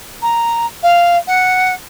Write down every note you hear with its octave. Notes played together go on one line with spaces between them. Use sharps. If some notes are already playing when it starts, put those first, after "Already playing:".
A#5
F5
F#5